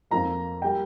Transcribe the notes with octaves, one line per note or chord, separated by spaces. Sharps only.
F2 F3 A#3 A#5
G3 A#3 G5